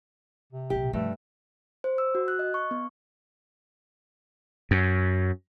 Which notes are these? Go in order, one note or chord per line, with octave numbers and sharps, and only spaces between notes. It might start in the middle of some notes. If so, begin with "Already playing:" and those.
C3
B1 A#2 G4
G2 C3 F3 A3
C5
E6
F#4
F#6
D#5
C#6
B3
F#2